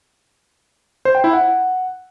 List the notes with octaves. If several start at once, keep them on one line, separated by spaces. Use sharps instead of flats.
C5
G5
E4
F#5